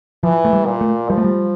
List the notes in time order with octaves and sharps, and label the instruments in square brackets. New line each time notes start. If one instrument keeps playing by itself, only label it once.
[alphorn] E3 [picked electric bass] F3
[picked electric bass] A3
G3
[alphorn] A#2
[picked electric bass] A3
[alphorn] F3 [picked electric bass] G3
[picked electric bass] A3
G3